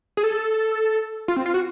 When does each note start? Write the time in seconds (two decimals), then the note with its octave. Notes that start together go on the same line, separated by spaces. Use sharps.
0.17 G#4
0.24 A4
1.28 F4
1.36 C4
1.46 F4
1.54 F#4